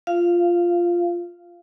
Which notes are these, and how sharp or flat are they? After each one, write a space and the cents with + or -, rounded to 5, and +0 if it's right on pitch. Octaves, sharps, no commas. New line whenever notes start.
F4 -5 F5 -15